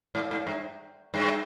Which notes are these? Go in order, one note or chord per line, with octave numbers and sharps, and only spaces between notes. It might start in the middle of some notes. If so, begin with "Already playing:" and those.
G#2
G#2
G2
G2